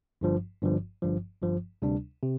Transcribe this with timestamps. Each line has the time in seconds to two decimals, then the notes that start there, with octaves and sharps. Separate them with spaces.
0.21 G1 G2 F3
0.62 G1 G2 F3
1.02 G1 G2 F3
1.42 G1 G2 F3
1.82 D2 C3 G3 D4
2.22 C3